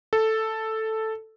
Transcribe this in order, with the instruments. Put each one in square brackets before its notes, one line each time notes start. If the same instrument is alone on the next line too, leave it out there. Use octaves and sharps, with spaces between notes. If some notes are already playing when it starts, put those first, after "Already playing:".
[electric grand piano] A4